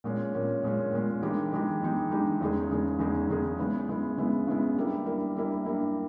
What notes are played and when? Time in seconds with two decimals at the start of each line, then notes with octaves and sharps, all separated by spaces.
0.04 A#2 G#3 C#4
0.34 A#2 G#3 C#4
0.63 A#2 G#3 C#4
0.93 A#2 G#3 C#4
1.22 G2 E3 G#3 D#4 G4
1.52 G2 E3 G#3 D#4 G4
1.81 G2 E3 G#3 D#4 G4
2.10 G2 E3 G#3 D#4 G4
2.40 E2 C#3 G#3 D#4 G#4
2.70 E2 C#3 G#3 D#4 G#4
2.99 E2 C#3 G#3 D#4 G#4
3.29 E2 C#3 G#3 D#4 G#4
3.58 C#3 G#3 B3 E4
3.88 C#3 G#3 B3 E4
4.17 C#3 G#3 B3 E4
4.47 C#3 G#3 B3 E4
4.76 G2 G3 A#3 E4
5.06 G2 G3 A#3 E4
5.36 G2 G3 A#3 E4
5.65 G2 G3 A#3 E4